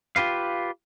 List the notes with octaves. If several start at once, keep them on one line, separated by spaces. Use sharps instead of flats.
F4 G4 B4 F5